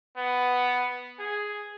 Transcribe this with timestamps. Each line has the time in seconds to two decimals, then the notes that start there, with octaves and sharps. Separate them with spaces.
0.17 B3
1.20 G#4